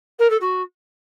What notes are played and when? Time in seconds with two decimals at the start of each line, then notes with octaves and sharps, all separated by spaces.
0.19 A#4
0.30 A4
0.40 F#4